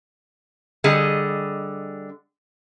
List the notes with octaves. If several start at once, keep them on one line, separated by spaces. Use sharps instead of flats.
D3 G3 G#4 D#5